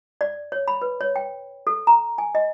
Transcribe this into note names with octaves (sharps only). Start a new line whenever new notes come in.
D5
C#5
B5
B4
C#5
G5
A4
A#5
G#5
D#5